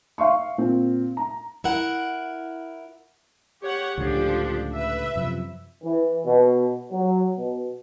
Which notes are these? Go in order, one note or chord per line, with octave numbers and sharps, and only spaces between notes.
E5 F5 C6 C#6
A#2 C4
A#5
E4 A#4 F#5
G4 C#5 F#5
C#2 A2 D3 F3 D4 G4
B4 E5
F#2 C3 F3
E3
B2
F#3
B2